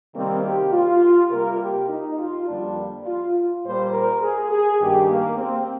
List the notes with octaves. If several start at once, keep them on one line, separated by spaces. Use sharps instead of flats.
C3 D#3 G3 A#3 C4
G4
F4
C3 G3 A#3 A#4
G4
D#4
F4
F2 D3 G3 A#3 D4
F4
A#2 G3 A#3 C5
A#4
G#4
G#4
G2 D#3 A#3 G4
A#3
C4